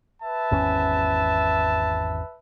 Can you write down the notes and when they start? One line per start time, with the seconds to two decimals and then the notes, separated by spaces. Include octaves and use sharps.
0.23 B4 E5 A5
0.51 G#1 E2 C#4